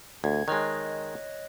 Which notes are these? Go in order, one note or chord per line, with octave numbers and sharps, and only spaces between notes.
D2 G#6
D#3 G#3 C#5 D#5 F#6